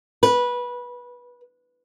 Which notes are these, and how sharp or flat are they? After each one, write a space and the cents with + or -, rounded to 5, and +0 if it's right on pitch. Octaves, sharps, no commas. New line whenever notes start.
B4 -20